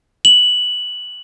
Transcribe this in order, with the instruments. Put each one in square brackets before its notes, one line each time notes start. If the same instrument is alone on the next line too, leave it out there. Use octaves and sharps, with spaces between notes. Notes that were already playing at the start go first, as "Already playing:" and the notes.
[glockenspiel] F#7